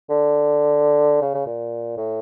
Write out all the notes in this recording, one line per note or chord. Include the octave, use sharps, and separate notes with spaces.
D3
C#3
C#3
A#2
A2